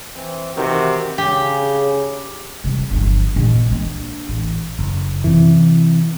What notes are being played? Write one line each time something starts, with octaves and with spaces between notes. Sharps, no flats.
E3 C4
C3 D#3 E3 F#4
C#3 G4
C3 G3
G1 F3
A#1 B2
A#3 D4
A1
F#1
C3 E3